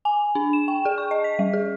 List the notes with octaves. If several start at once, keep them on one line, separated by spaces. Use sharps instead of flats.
G#5
D4
E7
G5
G#4
C#6
D#5
B6
G3
G#4